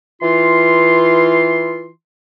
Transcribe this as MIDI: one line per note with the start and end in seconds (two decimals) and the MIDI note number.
0.22 1.89 52
0.22 1.89 65
0.22 1.89 84